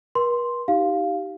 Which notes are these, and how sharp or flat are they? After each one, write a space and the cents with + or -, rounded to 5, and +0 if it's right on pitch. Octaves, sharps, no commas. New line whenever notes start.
B4 -45 C6 +0
D#4 +15 G4 -20 F5 +0